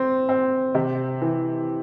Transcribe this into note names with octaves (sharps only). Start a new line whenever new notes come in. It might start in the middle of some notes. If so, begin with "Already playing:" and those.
Already playing: C4
C4
C3
E3